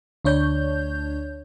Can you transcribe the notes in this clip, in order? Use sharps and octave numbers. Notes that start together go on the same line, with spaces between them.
D2 D4 C#5 G6